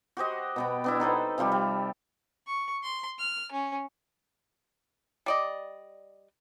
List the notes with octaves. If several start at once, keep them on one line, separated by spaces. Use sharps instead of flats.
F#4 G4 C5 D#5
B2 B3 G5
B3 D4 E4
D#4 A4 B4 C5
C3 F3 G3 G4
G3
C#6
C6
F6
C#4
G3 D5 D#5